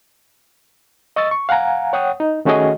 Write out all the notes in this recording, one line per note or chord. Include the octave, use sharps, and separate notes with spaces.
D#5 C#6 D#6 E6 A6
C#6
F5 F#5 G#5 A#5
C#5 F#5 G5 D#6
D#4
D#3 A3 C#4 F#4 G#4 D#5